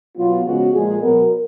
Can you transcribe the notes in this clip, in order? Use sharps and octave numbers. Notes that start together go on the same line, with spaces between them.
B2 F#3 B3 F4
C#3 F3 G#3 B3 F#4
A#2 F3 G#3 G#4
B2 F#3 B3 A#4